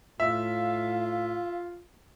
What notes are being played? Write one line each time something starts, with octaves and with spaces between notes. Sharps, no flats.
A2 F4 E5 F5